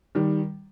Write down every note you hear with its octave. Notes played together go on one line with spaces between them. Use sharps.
D#3 G3